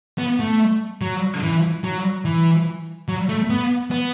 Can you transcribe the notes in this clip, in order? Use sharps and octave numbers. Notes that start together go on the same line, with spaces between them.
B3
A3
F#3
E3
F#3
E3
F#3
A3
B3
B3